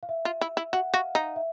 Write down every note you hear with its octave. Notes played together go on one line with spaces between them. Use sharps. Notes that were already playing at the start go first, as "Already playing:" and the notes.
F5
E5
F4
E4
E4
F#4 F#5
F#4 F5
D#4 F5
E5